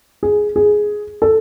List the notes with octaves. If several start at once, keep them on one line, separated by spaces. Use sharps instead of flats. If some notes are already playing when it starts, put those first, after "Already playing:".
G#4
G#4
A4